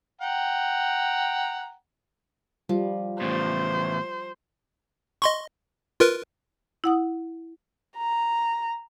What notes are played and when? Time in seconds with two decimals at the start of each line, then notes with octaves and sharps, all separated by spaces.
0.21 F#5 G5 A#5
2.69 F3 G3
3.21 E2 A2 C5
5.22 D#5 C6 C#6
6.00 F4 A#4 B4
6.84 E4 F#5 D#6
7.98 A#5